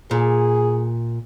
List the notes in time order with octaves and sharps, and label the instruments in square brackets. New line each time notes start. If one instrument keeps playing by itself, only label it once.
[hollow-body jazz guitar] A#2 [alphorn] G#4